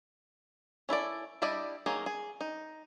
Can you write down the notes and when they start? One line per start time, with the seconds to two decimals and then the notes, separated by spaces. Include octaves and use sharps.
0.89 C#4 E4 A4 D5
1.42 G3 D4 E4 D5 D#5
1.86 D#3 F#3 A#3 G#4
2.06 G#4
2.41 D#4